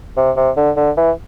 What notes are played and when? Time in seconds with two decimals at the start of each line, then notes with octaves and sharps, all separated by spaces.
0.17 C3
0.36 C3
0.57 D3
0.76 D3
0.97 E3